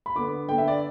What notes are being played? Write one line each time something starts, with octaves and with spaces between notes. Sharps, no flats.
B5
D3 B3 D6
D3 B3 G5
E5
D5